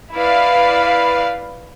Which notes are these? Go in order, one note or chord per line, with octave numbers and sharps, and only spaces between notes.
E4 B4 D5 F5